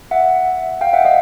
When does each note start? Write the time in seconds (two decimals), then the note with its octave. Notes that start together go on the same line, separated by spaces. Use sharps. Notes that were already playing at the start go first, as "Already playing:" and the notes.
0.11 E5 F#5
0.81 F5 G5
0.93 E5 F#5
1.05 D#5 F5